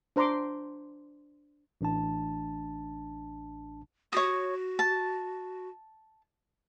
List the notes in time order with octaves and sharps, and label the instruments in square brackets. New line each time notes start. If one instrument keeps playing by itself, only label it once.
[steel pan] D4 C5 A#5 C6 D6
[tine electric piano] A1 D4 A5
[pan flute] F#4 [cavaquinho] C#5 D#6
[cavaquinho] A5